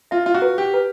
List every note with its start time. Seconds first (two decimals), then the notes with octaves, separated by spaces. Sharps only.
0.11 F4 E5
0.26 F4
0.35 F#4
0.42 B4
0.58 G4
0.74 B4